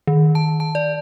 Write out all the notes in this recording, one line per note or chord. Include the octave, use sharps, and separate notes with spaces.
D#3
A5
A5
D5